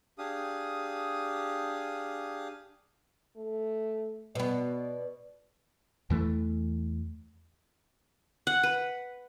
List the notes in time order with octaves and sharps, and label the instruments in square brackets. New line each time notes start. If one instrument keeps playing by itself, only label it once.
[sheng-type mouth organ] D4 G4 G#4 F5 D#6
[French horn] A3
[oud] B2 B3 [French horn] D5
[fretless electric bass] E2 E3 A3
[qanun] F#5
B4